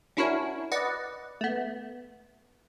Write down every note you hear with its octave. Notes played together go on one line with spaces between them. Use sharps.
C#4 D4 E4 F#4 A#4 C#5
B4 D5 D#5 F#5
A3 B3